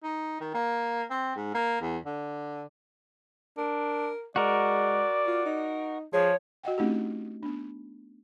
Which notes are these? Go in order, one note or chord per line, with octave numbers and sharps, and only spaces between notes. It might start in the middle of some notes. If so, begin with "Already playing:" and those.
D#4
D#3
A#3
C4
G#2
A#3
E2
D3
D4 A#4
G#3 F#4 A#4 D5
F4
D#4
F3 G#4 C#5
F#4 D#5 F#5 G5
A3 C4 C#4 D#4 E4 G4
B3 D4